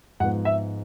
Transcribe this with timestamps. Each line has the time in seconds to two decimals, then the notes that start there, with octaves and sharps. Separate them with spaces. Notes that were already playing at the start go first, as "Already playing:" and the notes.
0.20 G#2 F3 G#3 B3 F#5
0.45 E5